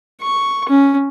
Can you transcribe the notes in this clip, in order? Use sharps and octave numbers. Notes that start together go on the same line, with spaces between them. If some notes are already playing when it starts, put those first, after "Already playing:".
C#6
C#4